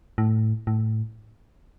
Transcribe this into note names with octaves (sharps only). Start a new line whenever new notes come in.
A2
A2